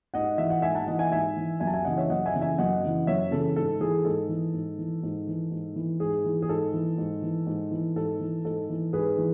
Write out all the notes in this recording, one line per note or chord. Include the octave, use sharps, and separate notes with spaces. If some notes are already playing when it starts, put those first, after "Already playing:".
G#2 D#5 F#5
E3 E5
F#5
G#2 E5 G#5
F#5 A5
E3 D#5 F#5
E5 G#5
G#2 E5 G#5
E3
F#2 E5 G#5
A5
E5 G#5
C#3 E3 D#5 F#5
C#5 E5
F#2 D#5 F#5
E5 G#5
C#3 E3
E5 G#5
F#2 D#5 F#5
C#3 E3
F#2 C#5 E5
C#3 E3 A4
G#2 A4
E3 G#4
G#2 A4
E3
G#2
E3
G#2
E3
G#2
E3
G#2 G#4
E3
G#4
G#2 A4
E3
G#2
E3
G#2
E3
G#2 A4
E3
G#2 A4
E3
G#2 G#4 B4
E3